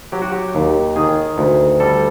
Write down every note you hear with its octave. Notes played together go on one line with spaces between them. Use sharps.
F#3 G4
F#4
G4
D#2
D#3 G#4
D2
G3 A4